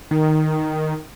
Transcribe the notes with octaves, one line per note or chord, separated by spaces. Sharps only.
D#3